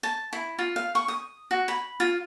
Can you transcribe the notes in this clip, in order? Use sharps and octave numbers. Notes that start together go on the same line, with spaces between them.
A5
E4
F4
F5
C#6
D#6
F#4
B5
F4